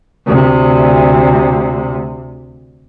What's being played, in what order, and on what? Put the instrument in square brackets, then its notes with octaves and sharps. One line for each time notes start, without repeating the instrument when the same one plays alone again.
[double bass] D2 C3